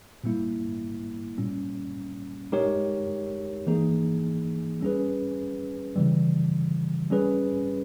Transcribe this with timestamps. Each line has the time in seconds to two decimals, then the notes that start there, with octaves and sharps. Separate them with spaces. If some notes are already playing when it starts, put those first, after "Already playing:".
0.24 A#2 G3 A#3 E4
1.38 A#2 G3 C#4
2.52 G#3 D#4 G4 A#4 C#5
3.67 E3 A#3 D#4 G#4
4.81 G3 C#4 G#4 B4
5.96 C#3 E3 G3
7.10 G3 C#4 G#4 B4